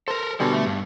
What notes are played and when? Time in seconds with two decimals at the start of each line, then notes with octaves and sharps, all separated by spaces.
0.08 A4 A#4 C5
0.40 B2 D3 G3 A4 G#5 A5
0.53 A3
0.66 G2